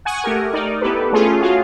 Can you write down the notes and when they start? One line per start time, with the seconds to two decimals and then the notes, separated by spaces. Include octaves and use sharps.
0.05 F#5 G#5 C#6 D#6
0.24 A3 G4 A#4
0.53 D#4 A#4 D5
0.81 B3 E4 G4 A4 B4
1.13 A3 C#4 F4 G#4
1.40 F4 F#4 G#4 C#5 F5